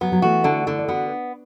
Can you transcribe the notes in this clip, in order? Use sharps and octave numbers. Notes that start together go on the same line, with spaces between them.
F#3 B3
F#3
E3 A3 F#4
D3 E4 A4
D3 E4 A4
D5
B3 F#4 B4